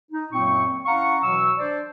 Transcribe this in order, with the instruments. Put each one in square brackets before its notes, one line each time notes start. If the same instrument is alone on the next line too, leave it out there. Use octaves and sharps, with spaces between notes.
[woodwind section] D#4
F#2 A#2 F#3 A#3 C4 C#6
C#4 E4 F5 F#5 A#5 C#6
B2 E3 F#3 C#6 E6
D4 C5 D5